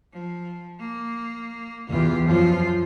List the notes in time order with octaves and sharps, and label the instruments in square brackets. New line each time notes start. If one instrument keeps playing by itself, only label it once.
[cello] F3
A#3
[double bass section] E2 E3 [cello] F4 G4
[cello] F#2 F4 [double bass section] F3